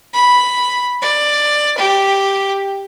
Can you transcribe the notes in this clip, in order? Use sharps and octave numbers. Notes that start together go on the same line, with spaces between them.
B5
D5
G4